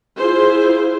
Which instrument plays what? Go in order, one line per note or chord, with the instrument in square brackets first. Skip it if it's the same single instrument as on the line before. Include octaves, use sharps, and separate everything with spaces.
[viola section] E4 F4 G#4 C5